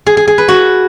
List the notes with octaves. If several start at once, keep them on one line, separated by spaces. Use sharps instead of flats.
G#4
G#4
G#4
B4
F#4